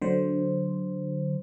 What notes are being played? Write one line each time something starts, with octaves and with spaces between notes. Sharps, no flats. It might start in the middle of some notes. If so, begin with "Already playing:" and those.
D3 F#3 C5